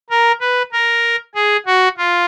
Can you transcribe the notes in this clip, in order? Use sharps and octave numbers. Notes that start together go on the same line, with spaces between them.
A#4
B4
A#4
G#4
F#4
F4